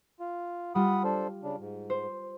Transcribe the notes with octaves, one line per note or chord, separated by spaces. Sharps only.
F4
G3 F4 F#5 B5 D#6
D4 A4 C5
C#3 D4
G#2
C5